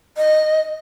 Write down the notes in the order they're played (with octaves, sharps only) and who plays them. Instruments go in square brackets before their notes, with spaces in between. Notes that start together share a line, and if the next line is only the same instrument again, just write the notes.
[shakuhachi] D#5